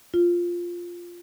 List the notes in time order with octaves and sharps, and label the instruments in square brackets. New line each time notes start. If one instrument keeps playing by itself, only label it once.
[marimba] F4